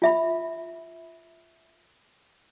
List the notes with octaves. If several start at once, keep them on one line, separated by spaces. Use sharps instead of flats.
F4 E5 B5